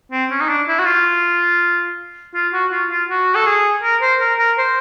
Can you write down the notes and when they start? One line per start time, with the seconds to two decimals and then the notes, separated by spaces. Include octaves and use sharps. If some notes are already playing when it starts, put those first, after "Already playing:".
0.12 C4
0.31 C#4
0.41 D#4
0.49 D4
0.68 E4
0.79 F#4
0.86 F4
2.35 F4
2.53 F#4
2.72 F4
2.90 F4
3.09 F#4
3.35 A4
3.46 G#4
3.83 A#4
4.02 C5
4.21 A#4
4.39 A#4
4.58 C5